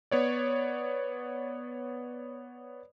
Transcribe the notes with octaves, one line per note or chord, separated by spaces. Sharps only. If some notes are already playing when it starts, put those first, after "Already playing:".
B3 C#5 D5